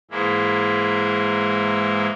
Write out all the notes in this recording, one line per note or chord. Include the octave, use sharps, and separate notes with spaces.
G#2 E3 G#3 A#3 E4